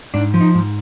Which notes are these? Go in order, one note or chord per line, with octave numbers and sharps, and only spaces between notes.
G#2 D4
F3
D#4
G#2